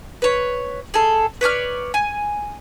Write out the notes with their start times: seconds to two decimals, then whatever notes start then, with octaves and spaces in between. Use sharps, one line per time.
0.22 B4 C#5
0.94 G#4 A4
1.41 B4 C#5 D5 F6
1.94 G#5